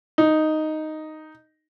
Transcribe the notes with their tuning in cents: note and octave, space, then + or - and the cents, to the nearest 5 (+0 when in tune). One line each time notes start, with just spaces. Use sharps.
D#4 +0